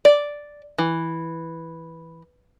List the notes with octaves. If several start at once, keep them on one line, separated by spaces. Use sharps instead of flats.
D5
E3